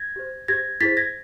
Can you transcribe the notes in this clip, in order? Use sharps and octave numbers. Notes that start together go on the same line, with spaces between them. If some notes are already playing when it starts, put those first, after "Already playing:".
Already playing: G#6 A#6
G4 C5
G4 C5 G#6 A#6
E4 G#4 C5 A6 B6
G#6 A#6